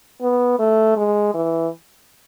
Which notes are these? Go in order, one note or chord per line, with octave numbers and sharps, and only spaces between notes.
B3
A3
G#3
E3